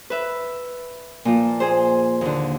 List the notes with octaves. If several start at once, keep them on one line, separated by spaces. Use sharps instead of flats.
B4 E5
A#2 F3 F4
G#4 C5
D#2 D3